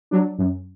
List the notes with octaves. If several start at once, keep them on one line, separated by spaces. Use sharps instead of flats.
F#3 D4
F#2